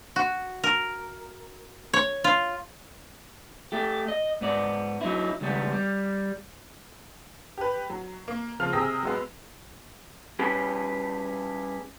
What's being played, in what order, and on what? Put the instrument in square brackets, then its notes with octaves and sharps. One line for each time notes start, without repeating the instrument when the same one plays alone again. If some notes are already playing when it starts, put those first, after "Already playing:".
[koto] F#4
A#4
C#5
F4
[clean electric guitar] A3 G4
D#5
G#2 B3 D5
F#3 D#4 E4
C#2 D#3 G3 B3
G3
[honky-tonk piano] G4 B4
F#3
A#3
C#3 F3 F4 F6
C3 G#4 G5 D#6 E6 A#6
F#3 G#3 B3
[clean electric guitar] G3 C#4 G4 G#4 B4